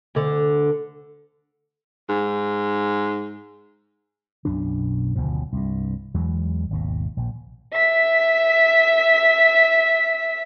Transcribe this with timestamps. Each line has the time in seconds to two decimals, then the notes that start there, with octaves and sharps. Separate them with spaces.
0.15 D2 D3
2.09 G#2
4.45 B1 F#2 B2 D4
5.15 F#1 D2 B2 F3
5.52 C2 G2
6.14 E2 E3 F#3 G#3
6.71 G#1 D#2 B2
7.17 A#1
7.73 E5 B6